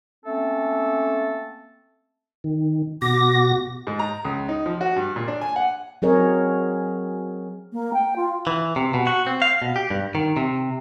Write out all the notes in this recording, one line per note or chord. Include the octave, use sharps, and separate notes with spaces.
A3 A#3 C4 C#4 A4
D#3
B2 F#4 D6 A#6
G#2
A#5
C#2
D#4
F3
F#4
G2
A#2
D4
G#5
F#5
F#3 C4 G#4 A#4 C#5 D#5
A#3
G5
F4
E3
C3
B2
F#4
C4
F5
B2
G4
G2
D#3
C3